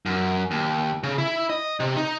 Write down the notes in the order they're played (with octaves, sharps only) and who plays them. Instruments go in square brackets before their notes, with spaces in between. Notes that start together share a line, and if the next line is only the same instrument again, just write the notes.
[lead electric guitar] F#2
D#2
C#3
E4
D#5
C3
D#4